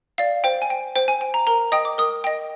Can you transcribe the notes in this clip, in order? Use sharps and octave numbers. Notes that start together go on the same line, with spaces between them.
D5 F5
C5 G5
G#5
G5
C5 G5
G#5
G5
A#5
A#4 A#5
D#5 G5 D#6
D6
A#4 D#6
D#5 G5